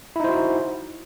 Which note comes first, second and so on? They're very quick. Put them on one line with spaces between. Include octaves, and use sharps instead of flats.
E4 D#4 C5 F#4